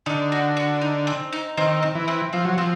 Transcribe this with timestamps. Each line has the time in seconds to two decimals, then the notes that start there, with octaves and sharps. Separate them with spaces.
0.06 D3 D#4
0.32 F#4
0.57 F#4
0.81 D#4
1.07 C4
1.33 D#4
1.58 D#3 C4
1.83 C4
1.95 E3
2.08 C4
2.33 F3 C4
2.45 F#3
2.57 F3 C4